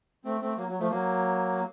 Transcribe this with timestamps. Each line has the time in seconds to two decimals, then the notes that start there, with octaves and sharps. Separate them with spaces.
0.25 A3 C4
0.42 A3 C4
0.57 F#3 A#3
0.68 F#3
0.80 F3 A3
0.91 F#3 A#3